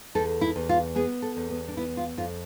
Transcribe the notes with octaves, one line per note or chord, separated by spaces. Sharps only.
E2 A4
E4
E2
F4
B3 G#4
A4
E2
B3
D4
B3 E4
F4
F2 F4